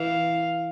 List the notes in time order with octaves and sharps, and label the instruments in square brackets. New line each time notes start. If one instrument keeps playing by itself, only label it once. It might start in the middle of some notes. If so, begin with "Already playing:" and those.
Already playing: [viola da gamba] E3 [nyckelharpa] F5